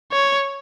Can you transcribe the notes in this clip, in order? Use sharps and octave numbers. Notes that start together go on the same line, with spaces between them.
C#5